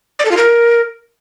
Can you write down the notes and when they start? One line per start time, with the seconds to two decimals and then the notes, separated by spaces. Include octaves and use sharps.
0.19 D5
0.25 A4
0.31 F4
0.37 A#4